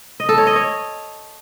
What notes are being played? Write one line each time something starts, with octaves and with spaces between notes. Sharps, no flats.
D#5
A4
C#5
D#5
C#5